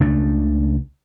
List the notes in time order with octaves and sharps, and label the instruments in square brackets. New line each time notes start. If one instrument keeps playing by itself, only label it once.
[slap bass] C#2 C#3 A3 D4